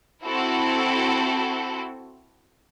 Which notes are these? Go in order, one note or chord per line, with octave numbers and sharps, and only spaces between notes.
C4 E4 F#4 A4